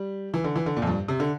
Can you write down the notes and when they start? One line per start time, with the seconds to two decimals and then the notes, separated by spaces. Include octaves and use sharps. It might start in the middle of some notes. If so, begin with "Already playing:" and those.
Already playing: G3
0.34 E3
0.44 D3
0.56 E3
0.66 D3
0.77 A#2
0.82 F2
0.87 G2
1.08 C3
1.20 D3